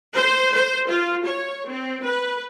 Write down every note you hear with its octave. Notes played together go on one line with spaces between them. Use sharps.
C5
C5
F4
C#5
C4
B4